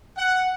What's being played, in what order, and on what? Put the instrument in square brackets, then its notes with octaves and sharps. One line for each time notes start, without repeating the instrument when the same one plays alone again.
[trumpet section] F#5